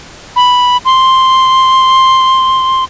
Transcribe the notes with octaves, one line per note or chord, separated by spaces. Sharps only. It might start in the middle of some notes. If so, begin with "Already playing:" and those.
B5
C6